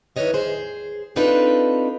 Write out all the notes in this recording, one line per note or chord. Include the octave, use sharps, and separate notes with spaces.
D#3 E3 B4 C#5 D#5 E5
G#4 C5
C4 D4 D#4 F4 A4 B4